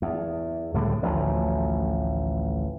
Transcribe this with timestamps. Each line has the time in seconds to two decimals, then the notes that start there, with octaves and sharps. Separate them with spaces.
0.02 E2
0.74 C#2 A2 D3 G3
1.03 A1 D2 A2 F3